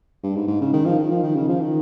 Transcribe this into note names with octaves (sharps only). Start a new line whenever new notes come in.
G2
G#2
G#2
C#3
D#3
F3
D#3
F3
D#3
C#3
F3
D#3